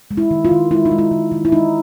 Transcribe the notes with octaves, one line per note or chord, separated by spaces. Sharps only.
G#3
E4
D#3
F4
D#3
G#3 E4
D#4
G#3
E4
D#3
D#3
E4
G#3 D#4